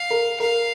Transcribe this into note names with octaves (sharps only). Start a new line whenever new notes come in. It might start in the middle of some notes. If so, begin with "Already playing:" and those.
Already playing: F5
A#4
A#4 F5